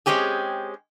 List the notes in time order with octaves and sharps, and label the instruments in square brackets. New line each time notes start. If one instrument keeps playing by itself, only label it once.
[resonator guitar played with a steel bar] G#3 C4 C#4 G4 G#4